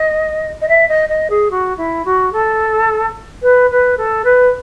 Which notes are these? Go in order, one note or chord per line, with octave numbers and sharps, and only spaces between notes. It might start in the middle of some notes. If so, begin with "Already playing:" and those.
Already playing: D#5
D#5
E5
D#5
D#5
G#4
F#4
E4
F#4
A4
B4
B4
A4
B4